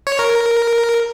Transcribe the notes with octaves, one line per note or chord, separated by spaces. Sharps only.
C#5
A#4